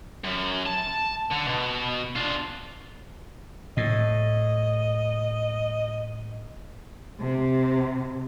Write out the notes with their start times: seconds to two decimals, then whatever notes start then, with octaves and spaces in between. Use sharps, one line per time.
0.24 F#2
0.66 A5
1.32 D3
1.47 B2
2.16 D4 F4
3.77 A2 D#5
7.21 C3